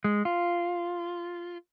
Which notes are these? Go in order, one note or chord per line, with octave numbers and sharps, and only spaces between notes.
G#3
F4